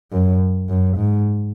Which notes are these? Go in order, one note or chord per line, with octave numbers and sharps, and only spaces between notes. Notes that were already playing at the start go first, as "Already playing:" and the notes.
F#2
F#2
G#2